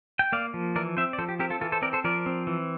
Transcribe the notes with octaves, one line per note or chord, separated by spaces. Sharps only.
G5
A#3 D5 F5
F3
E3 A#4 D5
C4 C5 E5
D5
F3 A4 C5
G4
C4 G4 A#4
F4 A4
E3 F4 A4
A4 C5
C4 A#4 D5
A4 C5
F3 A#4 D5
C4
E3